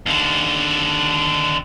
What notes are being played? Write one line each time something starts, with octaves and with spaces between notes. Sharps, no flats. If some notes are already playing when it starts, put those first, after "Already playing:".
D#2 D3